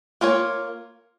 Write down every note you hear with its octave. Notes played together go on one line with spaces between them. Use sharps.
A#3 F4 A#4 C#5